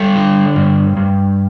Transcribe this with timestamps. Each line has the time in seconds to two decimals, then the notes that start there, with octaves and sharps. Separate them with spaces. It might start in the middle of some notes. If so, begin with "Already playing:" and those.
Already playing: G3 A4
0.15 D3
0.56 G2
0.97 G2